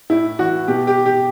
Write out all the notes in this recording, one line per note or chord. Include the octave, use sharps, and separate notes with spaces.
A2 E4
E3 F#4
B2 G4
G4
G4